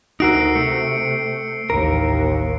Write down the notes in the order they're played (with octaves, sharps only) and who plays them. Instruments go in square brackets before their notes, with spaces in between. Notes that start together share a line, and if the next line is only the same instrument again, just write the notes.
[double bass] D2 [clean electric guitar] D#4 F#4 A#4 [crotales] E6 C7 D7
[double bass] C3 [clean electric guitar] A3 [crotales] C#7
[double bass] A1 D#2 [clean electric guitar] A#4